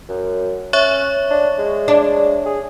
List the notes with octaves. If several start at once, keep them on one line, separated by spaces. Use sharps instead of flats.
F#2
C#4 C#5 E5 C#6
D4
G#3
D4
G#4